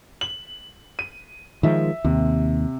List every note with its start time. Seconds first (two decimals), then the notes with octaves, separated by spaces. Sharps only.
0.21 F#7
0.99 D#7
1.63 D#3 F3 G#3 E5
2.05 D#2 C3